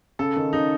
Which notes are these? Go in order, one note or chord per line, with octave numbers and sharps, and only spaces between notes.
C#3 A4
D#3
C#3 D#4